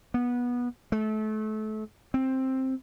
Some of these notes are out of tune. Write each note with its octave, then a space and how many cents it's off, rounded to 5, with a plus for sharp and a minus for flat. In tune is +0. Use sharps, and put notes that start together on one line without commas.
B3 -20
A3 -30
C4 +10